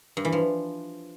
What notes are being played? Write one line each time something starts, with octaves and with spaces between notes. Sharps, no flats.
G2
E3
F3